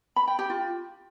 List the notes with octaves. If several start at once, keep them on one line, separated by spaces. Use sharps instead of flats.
B5
G5
G4
F4